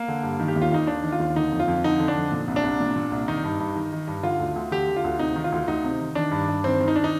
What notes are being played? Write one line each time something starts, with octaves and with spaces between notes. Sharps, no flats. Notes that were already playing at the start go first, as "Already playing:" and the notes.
Already playing: A#3
D3
G2
D#3
G4
D#2
F4
D#2 D#4
D#3 D4
D#3
F4
D#2
D3 D#4
F2
F4
F2
D3 D#4
D3
D4
F2
A#2
C2
D4
C2
A#2
A#2
C2
D#3 D#4
G2
G2
D#3
D#3
G2
D3 F4
D2
D2
D3 G4
D3
F4
D2
C3 D#4
D#3
F4
D2
D2 D#4
C3
D#3
D#3 D4
G2
G2
D#3 C4
D#3
D#4
D4
D#4